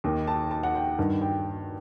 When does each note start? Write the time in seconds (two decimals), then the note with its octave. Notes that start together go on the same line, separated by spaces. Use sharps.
0.04 D#2 D#3
0.27 A5
0.51 A5
0.63 F#5
0.75 G5
0.98 G2 D#3
1.21 G5